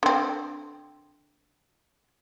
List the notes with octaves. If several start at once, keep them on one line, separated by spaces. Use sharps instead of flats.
D3 C4